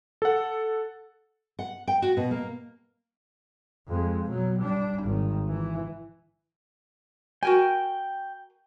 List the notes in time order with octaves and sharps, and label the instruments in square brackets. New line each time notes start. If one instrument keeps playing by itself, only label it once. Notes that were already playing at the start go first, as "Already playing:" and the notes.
[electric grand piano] A4 F#5
[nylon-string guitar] F#5
G5
F#4
B2
A#3
[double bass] F2 G#3
B2 F#3
G3 D4
G#1 D#3
E3
[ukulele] F#4 A#4 G#5 [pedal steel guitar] G5